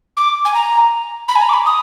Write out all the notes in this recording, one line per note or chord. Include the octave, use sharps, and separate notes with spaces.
D6
G#5
A#5
B5
G#5
A#5
D6
B5
D#6